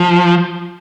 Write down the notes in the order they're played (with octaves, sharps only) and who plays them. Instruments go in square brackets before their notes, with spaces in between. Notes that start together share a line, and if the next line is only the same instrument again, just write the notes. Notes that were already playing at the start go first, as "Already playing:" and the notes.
Already playing: [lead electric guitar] F3